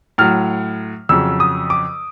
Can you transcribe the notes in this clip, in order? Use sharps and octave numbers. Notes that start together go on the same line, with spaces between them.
A2 F#3 F6
F2 C#3 F#3 E6
D#6
D6